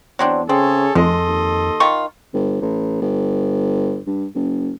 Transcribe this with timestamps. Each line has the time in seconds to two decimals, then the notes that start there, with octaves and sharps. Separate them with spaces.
0.19 E2 F#3 C4 D4
0.49 C#3 C4 G#4 A4 C#5
0.95 F1 F2 G#3 A4 D#5 C6
1.27 D#2
1.80 D#3 F4 C#6
2.34 G1
2.62 A1
3.02 G1
4.07 G2
4.35 F#1